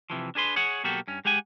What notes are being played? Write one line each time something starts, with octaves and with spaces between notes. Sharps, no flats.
C3 E3 F3
D4 G#4 B4 C6
G#4 C#5 F#5
B2 F#3 A#3 F#4 G4 A4
G2 C#4
G#3 G4 F#5 G#5